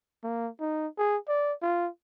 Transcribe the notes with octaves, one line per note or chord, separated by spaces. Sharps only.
A#3
D#4
G#4
D5
F4